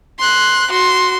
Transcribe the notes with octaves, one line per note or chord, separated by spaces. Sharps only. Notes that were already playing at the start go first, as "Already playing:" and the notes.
C6 F#6
F#4 C6